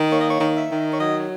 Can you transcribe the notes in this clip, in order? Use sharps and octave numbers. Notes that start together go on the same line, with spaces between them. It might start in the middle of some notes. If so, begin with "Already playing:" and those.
Already playing: D#3
A#3 C#5
D#5
C#5
D#3
E5
D#3
C#5
F#3 D#5